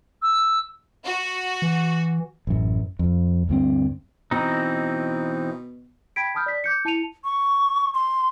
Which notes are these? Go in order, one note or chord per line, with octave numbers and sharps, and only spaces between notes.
E6
F#4
E3
A1 F#2
F2
D2 G2 C4
B2 E3 C4 D#4
G5 B5 G#6 B6 D7
A5 B5 D#6 F6 G6
D5 B6
D6 G6 C#7
E4 A5 C#7 D#7 F7
C#6
C6